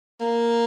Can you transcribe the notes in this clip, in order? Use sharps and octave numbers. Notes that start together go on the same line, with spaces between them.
A#3